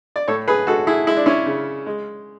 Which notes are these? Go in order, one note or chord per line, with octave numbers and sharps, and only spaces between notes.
D5
A2 A4 C#5
G#4 B4
G#3 F#4 A4
E4 G#4
G#3 E4
D4
C#4 E4
C#3
G#3